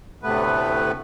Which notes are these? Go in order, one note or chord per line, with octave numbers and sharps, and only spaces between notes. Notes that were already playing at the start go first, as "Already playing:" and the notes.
D2 A2 C3 A3 B3 B4